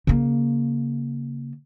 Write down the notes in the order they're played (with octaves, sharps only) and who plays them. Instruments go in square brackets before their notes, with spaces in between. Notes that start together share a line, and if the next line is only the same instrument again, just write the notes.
[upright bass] C#3 A#3